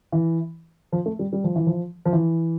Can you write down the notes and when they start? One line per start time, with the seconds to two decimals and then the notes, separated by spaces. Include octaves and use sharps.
0.12 E3
0.92 F3
1.06 A3
1.19 G3
1.33 G3
1.44 F3
1.56 E3
1.67 F3
2.05 F3
2.13 E3